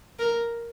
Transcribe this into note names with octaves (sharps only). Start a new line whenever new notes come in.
A#4